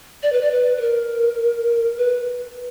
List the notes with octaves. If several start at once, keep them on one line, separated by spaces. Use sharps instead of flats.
D5
B4
D5
B4
B4
A#4
B4